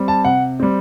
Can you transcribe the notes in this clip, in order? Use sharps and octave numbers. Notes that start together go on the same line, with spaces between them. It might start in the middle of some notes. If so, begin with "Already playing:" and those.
Already playing: G3 C4
A5
C3 F#5
G3 C4